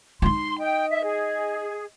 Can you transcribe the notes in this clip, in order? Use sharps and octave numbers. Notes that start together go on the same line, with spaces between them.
D#4 F4 C6
D#5 G5
E5
G#4